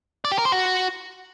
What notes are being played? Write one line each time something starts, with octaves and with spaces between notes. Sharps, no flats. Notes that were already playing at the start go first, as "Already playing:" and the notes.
D5
G4
A#4
C5
F#4